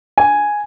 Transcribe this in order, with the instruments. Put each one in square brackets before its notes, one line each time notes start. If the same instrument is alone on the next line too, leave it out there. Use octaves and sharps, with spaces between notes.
[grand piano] G#5